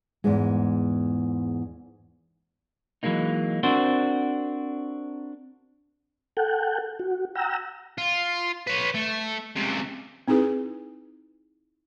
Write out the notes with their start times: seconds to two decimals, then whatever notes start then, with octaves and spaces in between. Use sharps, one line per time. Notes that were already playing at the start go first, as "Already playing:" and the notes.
0.24 E2 G#2 G#3
3.03 E3 F#3 G#3 A#3 D#4
3.63 C4 D4 F#4 A#4 C5
6.37 A4 F#5 G5
6.99 F#4
7.35 F#5 G5 A#5 E6
7.98 F4
8.67 B4 C#5
8.94 A3
9.56 C#2 C3
10.28 C4 D#4 E4 G#4 B4